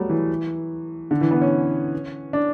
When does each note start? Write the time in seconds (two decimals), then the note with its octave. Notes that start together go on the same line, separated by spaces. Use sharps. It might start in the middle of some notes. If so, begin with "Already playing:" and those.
Already playing: F#3 G3 A3 B3
0.10 E3
1.11 D3
1.21 E3
1.31 B3
1.42 C#4
2.33 D4